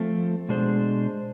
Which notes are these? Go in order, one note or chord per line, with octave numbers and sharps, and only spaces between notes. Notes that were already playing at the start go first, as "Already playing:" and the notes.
Already playing: F3 A3 C4
B2 G#3 D4 G#4 C5